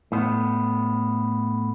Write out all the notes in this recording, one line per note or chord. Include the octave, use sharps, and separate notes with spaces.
A2 B3